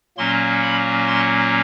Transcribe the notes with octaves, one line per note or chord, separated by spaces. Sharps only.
A#2 F#3 A#3 C#4 C6
B5
C6